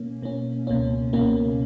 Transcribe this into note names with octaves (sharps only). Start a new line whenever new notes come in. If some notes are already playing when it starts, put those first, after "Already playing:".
Already playing: B2 A#3 C#4
B2 A#3 C#4
C#2 B2 A#3 C#4
C#2 B2 A#3 C#4